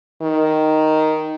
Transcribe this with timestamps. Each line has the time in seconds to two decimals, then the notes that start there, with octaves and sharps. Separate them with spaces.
0.22 D#3